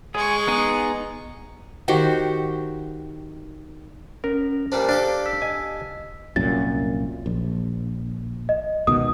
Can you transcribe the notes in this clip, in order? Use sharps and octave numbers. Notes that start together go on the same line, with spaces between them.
G#3 G#4 C#6
B3 D#4 G#4
D#3 F#4 G4 C5
C#4 A#4
A#2 G3 D4 C5
D4 G4 A4 F5
E6 B6
D#5 G#5
C2 F#2 A#2 A6
A#1
D#5
C#2 B2 D#3 D#6